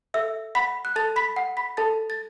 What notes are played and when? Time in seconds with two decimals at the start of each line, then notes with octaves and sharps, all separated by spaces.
0.14 A4 E5 E6
0.55 F#5 B5 B6
0.85 F#6
0.96 A4 A5 A6
1.16 B5 B6
1.36 F#5
1.57 B5 B6
1.77 A4 A5 A6
2.10 A6